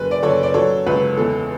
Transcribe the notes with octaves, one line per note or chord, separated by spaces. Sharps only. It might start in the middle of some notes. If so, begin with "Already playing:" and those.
Already playing: F#1 B4
D5
F#1 A4 C#5
D5
F#3 A4 C#5
C#2 B4
E2 A4